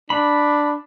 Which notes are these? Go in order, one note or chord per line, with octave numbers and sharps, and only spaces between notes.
D4 B5